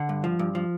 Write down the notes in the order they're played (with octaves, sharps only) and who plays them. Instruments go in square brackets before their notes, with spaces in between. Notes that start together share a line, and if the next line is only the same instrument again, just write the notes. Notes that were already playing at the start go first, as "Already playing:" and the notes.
Already playing: [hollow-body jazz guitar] D3 F#5
G2
F3
G2
F3